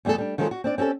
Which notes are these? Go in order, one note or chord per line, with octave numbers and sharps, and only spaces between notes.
E2 G3 A3 G#4 A4
G3 D4
D#3 F3 F#3 G#3 A4
F#4
C4 D4 D5
C4 C#4 G4 A4